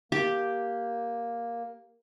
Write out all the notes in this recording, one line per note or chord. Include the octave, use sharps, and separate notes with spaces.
A#3 G4